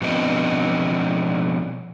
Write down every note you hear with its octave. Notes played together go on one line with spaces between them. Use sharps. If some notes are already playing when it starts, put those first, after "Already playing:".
B2 F3 B3 C4 D4 D#5